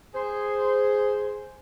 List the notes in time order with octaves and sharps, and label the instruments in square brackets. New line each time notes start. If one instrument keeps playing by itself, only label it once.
[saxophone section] G#4 C5